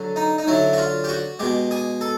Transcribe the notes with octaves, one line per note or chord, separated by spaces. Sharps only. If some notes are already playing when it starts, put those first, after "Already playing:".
Already playing: D3 F#3
D#4
D#4
D3 F#3 E4
F#4
F4
G4
F#4
B2 G#3 G4
G#4
A4